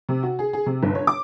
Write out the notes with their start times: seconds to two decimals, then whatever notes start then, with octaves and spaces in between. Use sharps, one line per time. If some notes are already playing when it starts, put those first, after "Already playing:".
0.09 C3
0.23 F#4
0.39 G#4
0.53 G#4
0.66 C3
0.83 G1
0.95 C#5
1.07 D6